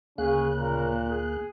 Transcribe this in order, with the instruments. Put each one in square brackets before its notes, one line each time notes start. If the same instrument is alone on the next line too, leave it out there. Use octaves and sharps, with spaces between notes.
[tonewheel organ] D2 A#3 F#6 [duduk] C#3 [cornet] C#4 [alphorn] G#4
[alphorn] A#2 [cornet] A#4
[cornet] G#4